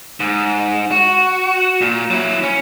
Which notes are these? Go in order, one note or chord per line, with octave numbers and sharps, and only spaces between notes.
G#2
F#4
A#2
F#3 E4
C#4